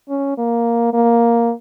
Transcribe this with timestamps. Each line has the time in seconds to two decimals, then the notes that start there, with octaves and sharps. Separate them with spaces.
0.09 C#4
0.38 A#3
0.93 A#3